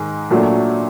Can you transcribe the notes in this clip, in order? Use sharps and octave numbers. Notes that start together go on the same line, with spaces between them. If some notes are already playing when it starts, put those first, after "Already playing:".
Already playing: G#2 D#3 G#3
A#2 F#3 A3 D4